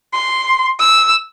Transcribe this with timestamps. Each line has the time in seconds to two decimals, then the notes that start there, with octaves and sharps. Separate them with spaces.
0.14 C6
0.80 E6